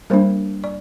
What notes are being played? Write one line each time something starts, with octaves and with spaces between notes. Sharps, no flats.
G3 A#3 D4 A#4 C5
D5